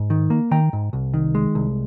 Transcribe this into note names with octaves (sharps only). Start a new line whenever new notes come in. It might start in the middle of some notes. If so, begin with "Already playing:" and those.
Already playing: G#2
D#3
A#3
D#3 G5 A#5
G#2
C2
D#3
G#3
C2